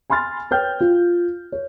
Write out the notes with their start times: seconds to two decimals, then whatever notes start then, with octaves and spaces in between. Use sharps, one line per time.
0.10 G#5 B5 C6 F6 A6
0.51 B4 C#5 G5 F6 G6
0.80 F4
1.52 C#5